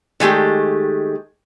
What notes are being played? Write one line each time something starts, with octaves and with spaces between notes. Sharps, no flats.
D#3 G#3 A3 G4